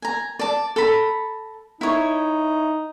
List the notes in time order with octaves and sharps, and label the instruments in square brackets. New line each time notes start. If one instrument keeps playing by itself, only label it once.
[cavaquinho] G#5 A#5
D5 A5
A4 A#5 B5
[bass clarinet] D#4 [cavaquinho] E4 C#5